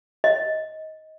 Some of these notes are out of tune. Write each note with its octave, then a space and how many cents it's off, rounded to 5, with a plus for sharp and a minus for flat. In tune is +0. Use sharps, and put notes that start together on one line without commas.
D#5 +15